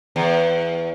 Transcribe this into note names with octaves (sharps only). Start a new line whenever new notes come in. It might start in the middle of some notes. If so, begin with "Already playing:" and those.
E2